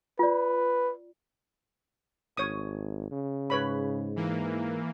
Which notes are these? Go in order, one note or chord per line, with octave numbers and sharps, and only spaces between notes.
F4 B4 D5
G#1 C#5 D#6
C#3
G#2 B4 C#5 B5
E3 A#3